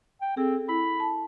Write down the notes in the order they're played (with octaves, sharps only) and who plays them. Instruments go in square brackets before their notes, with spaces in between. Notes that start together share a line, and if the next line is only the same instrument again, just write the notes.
[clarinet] G5
[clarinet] C4 [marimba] G#4 A4
[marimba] E4 [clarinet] B5
[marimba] A5